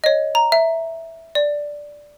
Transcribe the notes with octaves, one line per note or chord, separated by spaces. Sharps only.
C#5 D#5
A#5
E5
D5